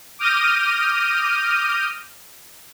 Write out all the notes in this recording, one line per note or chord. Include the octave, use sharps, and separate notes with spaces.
D6 D#6 F6 G6 A#6 D#7